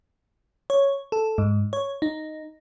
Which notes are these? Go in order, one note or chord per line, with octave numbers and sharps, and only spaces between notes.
C#5
A4
G#2
C#5
D#4